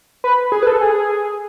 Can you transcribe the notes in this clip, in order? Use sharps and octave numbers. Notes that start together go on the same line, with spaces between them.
B4
G#4
B4
A4
G#4